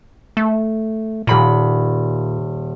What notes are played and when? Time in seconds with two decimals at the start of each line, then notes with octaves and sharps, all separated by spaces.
0.37 A3
1.27 D#1 A#2 B5 A#6